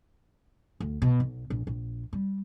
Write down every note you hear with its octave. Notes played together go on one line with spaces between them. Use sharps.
D2
B2
B1
A#1
A#1
G3